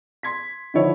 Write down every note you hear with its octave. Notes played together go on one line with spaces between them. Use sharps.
C6 G#6 B6
D3 D#3 F3 E4 C5 C#5